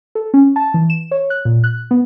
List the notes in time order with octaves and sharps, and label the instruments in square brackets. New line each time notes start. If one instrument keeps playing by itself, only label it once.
[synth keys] A4
C#4
A5
E3
E7
C#5
F#6
A#2
F#6
B3